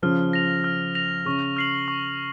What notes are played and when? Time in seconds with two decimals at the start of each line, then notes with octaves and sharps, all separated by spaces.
0.02 C#3 F3 F6
0.33 A#6 F7
0.64 F6
0.95 A#6 F7
1.25 C#3 C#6
1.57 F6 C7 F#7
1.88 C#6